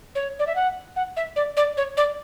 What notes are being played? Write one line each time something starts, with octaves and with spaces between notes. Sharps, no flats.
C#5
D5
E5
F#5
F#5
E5
D5
D5
C#5
D5